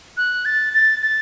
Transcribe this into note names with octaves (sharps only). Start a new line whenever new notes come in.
F#6
A6
A6
A6